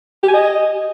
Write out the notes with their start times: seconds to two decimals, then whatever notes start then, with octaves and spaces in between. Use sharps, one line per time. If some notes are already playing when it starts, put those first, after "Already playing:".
0.23 G4
0.28 G#5
0.34 D#5